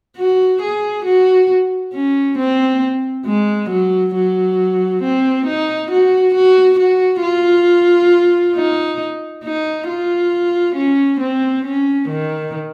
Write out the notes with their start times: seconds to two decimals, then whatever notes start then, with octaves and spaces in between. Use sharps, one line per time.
0.17 F#4
0.62 G#4
1.05 F#4
1.93 C#4
2.38 C4
3.26 G#3
3.70 F#3
4.15 F#3
5.03 C4
5.46 D#4
5.91 F#4
6.35 F#4
6.79 F#4
7.22 F4
8.55 D#4
9.44 D#4
9.88 F4
10.75 C#4
11.20 C4
11.65 C#4
12.09 D#3